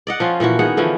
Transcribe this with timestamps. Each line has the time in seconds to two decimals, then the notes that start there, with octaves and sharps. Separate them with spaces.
0.07 D5 D#5 F#5
0.20 F3 C#4 F4
0.40 A#2 E3 F3 F#4
0.59 D#3 B3 G#4 F#5
0.77 D3 E3 F3 C#4